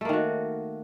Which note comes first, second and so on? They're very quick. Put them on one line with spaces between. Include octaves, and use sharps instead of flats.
A3 A#3 D#3 F#4